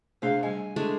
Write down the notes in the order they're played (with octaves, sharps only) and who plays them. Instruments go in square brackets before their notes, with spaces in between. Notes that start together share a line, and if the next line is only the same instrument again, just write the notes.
[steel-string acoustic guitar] C3 F5 [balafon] A3 D4 G#4
[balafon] G3 D#5 [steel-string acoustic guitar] G#5
[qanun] G#3 A3 D4